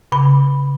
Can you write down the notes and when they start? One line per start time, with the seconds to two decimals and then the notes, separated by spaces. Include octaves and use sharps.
0.12 C#3 B5